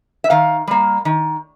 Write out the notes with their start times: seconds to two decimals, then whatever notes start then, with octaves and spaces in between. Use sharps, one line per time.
0.24 E5
0.30 D#3 F5
0.68 G3 A#3
1.05 D#3